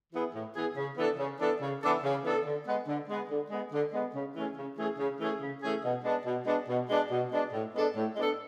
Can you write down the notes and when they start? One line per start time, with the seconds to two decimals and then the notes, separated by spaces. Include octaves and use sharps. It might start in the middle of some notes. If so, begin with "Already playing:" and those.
0.13 E3 B3 E4 G#4
0.35 A2
0.55 E3 B3 E4 G#4
0.77 C#3
0.97 E3 B3 D4 A4
1.18 C#3
1.40 E3 B3 D4 A4
1.61 C#3
1.82 E3 B3 D4 A4
2.04 C#3
2.24 E3 B3 D4 A4
2.45 D3
2.66 G#3 B3
2.88 D3
3.08 G#3 B3
3.30 D3
3.51 G#3 B3
3.73 D3
3.93 G#3 B3
4.15 C#3
4.35 E3 A3 C#4 G#4
4.57 C#3
4.78 E3 A3 C#4 G#4
4.98 C#3
5.20 E3 A3 C#4 G#4
5.41 C#3
5.62 E3 A3 C#4 G#4
5.84 B2
6.04 G#3 B3 D4
6.26 B2
6.46 G#3 B3 D4
6.68 B2
6.89 G#3 B3 D4
7.10 B2
7.31 G#3 B3 D4
7.53 A2
7.74 G#3 B3 D4 A4
7.95 A2
8.16 G#3 B3 D4 A4